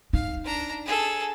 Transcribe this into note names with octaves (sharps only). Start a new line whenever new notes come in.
D#4 F5
D4 A#5
G#4 A4